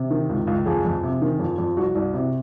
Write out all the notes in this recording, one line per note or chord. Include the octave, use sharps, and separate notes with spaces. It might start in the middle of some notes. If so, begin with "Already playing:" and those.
Already playing: C3
D#3
C#2
C#2
F2 G#4
F2
C3
D#3
F2
F2
C2 F#4
C2
C3